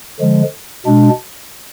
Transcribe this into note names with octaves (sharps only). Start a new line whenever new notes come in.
D3 F3 G#3
B2 G#3 D4